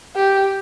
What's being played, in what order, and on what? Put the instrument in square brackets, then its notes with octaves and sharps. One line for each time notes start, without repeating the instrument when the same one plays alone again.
[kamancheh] G4